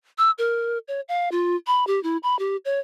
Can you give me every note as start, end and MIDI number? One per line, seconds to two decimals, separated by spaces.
0.18 0.31 88
0.38 0.78 70
0.88 1.01 73
1.08 1.29 77
1.32 1.56 65
1.67 1.86 83
1.87 2.02 67
2.03 2.17 64
2.23 2.38 83
2.39 2.57 67
2.65 2.80 73